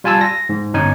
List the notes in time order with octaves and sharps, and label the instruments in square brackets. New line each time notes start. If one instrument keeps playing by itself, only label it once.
[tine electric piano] G3 F4 G#5 A5 E6
A#6
G#2
G1 C#4 D#4 G#5